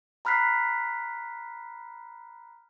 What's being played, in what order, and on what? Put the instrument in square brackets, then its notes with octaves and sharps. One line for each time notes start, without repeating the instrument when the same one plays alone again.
[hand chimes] A#5 B5 F6 F#6 B6 C7